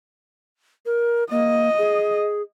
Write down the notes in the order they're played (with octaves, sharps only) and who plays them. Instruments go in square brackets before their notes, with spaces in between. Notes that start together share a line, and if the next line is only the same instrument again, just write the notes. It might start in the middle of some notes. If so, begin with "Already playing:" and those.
[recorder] A#4
[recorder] A#3 [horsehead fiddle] D#5
[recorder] G#4